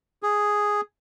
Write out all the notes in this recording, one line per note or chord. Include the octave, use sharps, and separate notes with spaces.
G#4